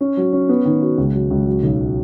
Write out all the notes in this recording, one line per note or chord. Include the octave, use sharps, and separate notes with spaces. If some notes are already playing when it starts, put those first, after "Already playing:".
C#4
F#3
C#4
B3
D#3
F#4
C#2
F#3
C#2
F#3
B1